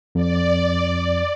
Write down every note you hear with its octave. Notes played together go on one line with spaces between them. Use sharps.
F2 D5